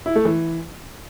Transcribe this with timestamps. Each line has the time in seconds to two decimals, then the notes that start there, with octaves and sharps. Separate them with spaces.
0.06 E4
0.16 A3
0.25 E3